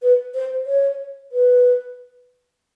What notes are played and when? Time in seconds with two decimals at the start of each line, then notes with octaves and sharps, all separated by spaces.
0.02 B4
0.34 C5
0.66 C#5
1.32 B4